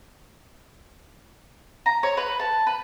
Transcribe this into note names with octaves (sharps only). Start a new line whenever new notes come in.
A#5
C#5
B4
A5
B4